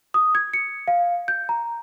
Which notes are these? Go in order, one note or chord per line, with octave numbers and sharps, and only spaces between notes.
D#6
G#6
C#7
F5
G6
A#5